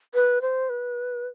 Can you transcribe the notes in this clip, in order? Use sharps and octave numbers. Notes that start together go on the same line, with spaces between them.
B4
C5
B4